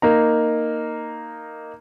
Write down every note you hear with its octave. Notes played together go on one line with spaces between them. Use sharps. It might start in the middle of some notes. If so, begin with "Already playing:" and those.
A#3 D#4 A#5